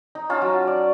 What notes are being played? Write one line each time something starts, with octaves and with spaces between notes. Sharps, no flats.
D#4
C#4 F4 A5
F#3
D5